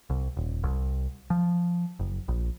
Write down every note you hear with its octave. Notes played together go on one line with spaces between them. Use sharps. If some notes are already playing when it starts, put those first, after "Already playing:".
C2
D#1
C2
F3
F#1
A#1